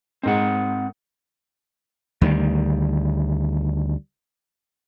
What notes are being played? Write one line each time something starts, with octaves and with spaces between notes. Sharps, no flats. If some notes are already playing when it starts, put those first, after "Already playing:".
G#2 C4 A#4 D#5 F#5
D2 D#3 E3 G3